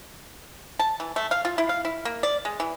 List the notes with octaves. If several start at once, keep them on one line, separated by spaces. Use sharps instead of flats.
A5
E3
A3
F5
F4
E4
F5
E4
A#3
D5
G#3
E3